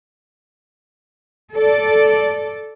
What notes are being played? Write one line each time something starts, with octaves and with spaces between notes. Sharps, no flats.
A4 D5